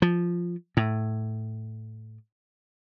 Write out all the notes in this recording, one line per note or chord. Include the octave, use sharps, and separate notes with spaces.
F3
A2